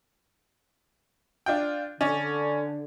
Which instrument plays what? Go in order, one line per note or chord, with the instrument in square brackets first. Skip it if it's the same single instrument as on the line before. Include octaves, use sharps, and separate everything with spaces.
[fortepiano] D4 F4 G5
[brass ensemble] D3 [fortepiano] C#4 D5